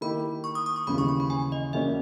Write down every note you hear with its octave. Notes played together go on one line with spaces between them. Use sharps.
D#3 A#3 E4 G4 B5
C#6
D#6
D#6
C#6
D#2 C#3 E3 B5
C#6
C#6
B5
G#5
D#5
E2 B2 A#3 C#4 E5